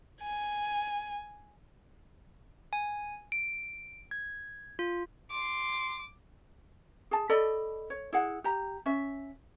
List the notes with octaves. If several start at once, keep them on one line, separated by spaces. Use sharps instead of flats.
G#5
G#5
D7
G#6
F4
C6 D6
G#4 A5
A4 D5 D#5 B5
C#5
E4 G#4 F#5
G4 A#5
C#4 E5